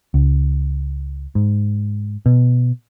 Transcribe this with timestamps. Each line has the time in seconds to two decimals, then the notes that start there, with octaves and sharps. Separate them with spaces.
0.14 C#2
1.35 G#2
2.26 B2